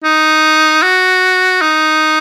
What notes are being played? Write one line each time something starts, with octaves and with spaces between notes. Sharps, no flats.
D#4
F#4
D#4